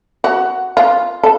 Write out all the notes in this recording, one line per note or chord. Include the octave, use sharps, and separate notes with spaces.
F#4
F4
A4